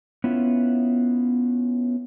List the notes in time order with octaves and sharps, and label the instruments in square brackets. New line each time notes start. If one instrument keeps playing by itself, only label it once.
[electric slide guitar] B3 C#4 E4 F4